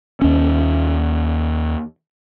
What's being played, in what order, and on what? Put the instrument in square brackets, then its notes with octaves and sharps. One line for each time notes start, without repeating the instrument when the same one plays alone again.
[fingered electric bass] D#2 C#4